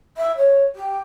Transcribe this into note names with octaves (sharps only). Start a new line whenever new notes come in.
E5
C#5
G4